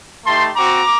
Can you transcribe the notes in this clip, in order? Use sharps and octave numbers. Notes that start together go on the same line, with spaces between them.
A3 D#4 G4 A5 C6
C4 F#4 A#5 D6